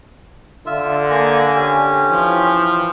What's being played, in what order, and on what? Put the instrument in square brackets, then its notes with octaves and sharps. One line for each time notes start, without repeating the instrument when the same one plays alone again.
[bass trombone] D3 [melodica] F4 E5
[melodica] A#3 D#5 [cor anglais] G#5
[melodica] C#4 G4
[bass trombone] E3 [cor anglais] F3